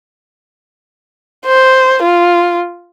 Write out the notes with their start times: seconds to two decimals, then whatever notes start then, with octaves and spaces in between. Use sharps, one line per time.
1.46 C5
2.03 F4